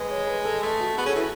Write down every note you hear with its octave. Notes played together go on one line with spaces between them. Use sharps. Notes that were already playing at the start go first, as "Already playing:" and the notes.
Already playing: G#3 B4
C#5
B4
A4
A3
F#4
B3 G#4
C#4 A4
E3